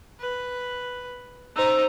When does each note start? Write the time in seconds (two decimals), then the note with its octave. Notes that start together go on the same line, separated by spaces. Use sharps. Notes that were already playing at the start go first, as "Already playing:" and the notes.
0.20 B4
1.56 D#4 C5 A#5 E6